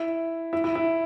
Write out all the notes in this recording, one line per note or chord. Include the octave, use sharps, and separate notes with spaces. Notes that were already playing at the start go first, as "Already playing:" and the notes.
Already playing: E4
E4
E4
E4